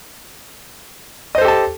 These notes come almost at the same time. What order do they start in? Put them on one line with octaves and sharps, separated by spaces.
D#5 C5 A4 G4 A5